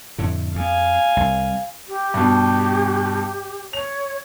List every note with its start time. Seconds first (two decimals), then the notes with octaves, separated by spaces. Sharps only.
0.18 F2 A2 D3
0.55 F2 F5 G#5
1.17 C2
1.88 G4
2.14 G2 B2
3.73 C#5 F7